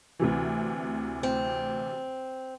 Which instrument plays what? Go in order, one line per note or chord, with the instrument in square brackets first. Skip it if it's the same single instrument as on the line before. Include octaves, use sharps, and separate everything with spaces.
[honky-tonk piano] D2 C3 E3
[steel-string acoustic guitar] C4